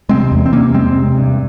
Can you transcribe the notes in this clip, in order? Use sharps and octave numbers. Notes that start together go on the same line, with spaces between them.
C3 G#3 C4
E2
C4
C3 A#3 C#4
E2 G#3 C4
C3
G2